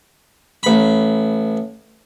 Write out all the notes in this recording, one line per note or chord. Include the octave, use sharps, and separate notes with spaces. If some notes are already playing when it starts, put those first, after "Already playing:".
A1 B5